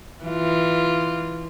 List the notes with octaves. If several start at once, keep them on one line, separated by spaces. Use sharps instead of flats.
E3 F4